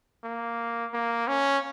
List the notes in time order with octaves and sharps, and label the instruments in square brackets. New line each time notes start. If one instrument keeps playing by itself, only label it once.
[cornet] A#3
A#3
C#4